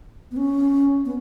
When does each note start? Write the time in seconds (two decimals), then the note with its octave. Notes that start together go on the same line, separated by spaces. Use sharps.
0.31 B3
0.37 C#4
1.05 B3